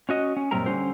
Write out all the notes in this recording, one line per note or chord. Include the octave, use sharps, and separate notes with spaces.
C#4 F#4 D#5
C#4
F#2 A#2 G3 C4 A#4 A#5
D3 G3 C#4 F#4 C5